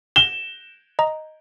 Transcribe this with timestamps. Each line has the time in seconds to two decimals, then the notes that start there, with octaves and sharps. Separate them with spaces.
0.16 E7 G7
0.99 D#5 A#5